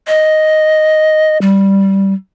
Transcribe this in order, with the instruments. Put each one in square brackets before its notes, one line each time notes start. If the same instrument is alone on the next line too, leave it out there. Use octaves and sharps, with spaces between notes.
[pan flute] D#5
G3